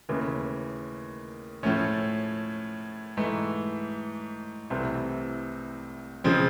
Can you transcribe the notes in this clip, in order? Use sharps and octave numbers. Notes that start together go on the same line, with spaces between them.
D#2 C#3 E3 A3
A2 F3 A3 C#4
G#2 E3 A3
C2 C3 E3 A3 C4
C#3 F3 G#3 C4